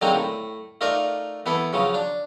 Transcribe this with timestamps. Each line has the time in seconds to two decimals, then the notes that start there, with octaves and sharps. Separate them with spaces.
0.02 D3 F#3 G#3 A#3 C4 D#4
0.15 A2
0.81 A3 D#4 F4 A#4 D5
1.46 E3 B3 E4 A4
1.73 C#3 F3 F#3
1.94 D4